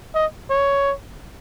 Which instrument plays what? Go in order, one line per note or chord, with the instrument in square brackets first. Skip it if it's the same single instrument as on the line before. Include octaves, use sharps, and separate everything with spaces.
[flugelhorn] D#5
C#5